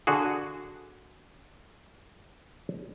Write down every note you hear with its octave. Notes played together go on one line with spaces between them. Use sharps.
D3 F#4 G#4